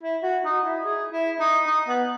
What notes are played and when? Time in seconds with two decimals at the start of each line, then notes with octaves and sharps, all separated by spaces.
0.03 E4
0.23 F#4
0.45 D#4
0.65 E4
0.84 G#4
1.12 E4
1.40 D#4
1.67 D#4
1.88 B3